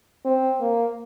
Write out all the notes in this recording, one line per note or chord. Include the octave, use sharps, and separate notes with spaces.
C4
A#3